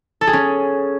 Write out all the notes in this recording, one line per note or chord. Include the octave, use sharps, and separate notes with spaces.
A4
G#4
C#4